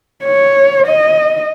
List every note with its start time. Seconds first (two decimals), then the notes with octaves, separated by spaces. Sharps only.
0.24 C#5
0.87 D#5